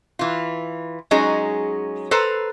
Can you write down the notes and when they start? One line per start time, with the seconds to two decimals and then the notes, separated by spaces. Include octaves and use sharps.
0.19 E3 F4
1.11 F#3 G#3 C#4 D#4 G#4
2.11 A4 B4 C5 A#5